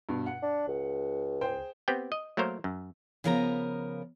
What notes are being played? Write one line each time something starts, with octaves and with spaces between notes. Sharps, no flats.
G2 B2
F#5
D4
C#2
G#4 C5 G5
B3 C4 G4 G5
D#5
F#3 A3 A#3 A#4 C5 C#5
F#2
C#3 F3 B3 A#4 E5 A#5